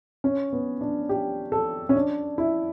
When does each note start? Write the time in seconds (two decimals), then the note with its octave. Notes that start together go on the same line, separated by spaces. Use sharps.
0.24 C#4
0.53 B3
0.81 D4
1.09 G4
1.52 A4
1.89 C#4
1.95 D4
2.38 E4